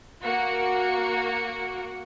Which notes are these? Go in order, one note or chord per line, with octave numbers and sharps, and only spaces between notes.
A#3 F#4 C#7